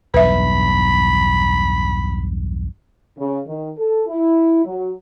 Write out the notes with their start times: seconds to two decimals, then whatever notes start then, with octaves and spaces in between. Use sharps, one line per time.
0.14 B1 E2 G2 B4 E5 B5
3.18 C#3
3.47 D#3
3.78 A4
4.08 E4
4.65 F#3